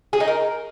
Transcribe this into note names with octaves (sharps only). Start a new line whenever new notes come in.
G#4
D#4
A#4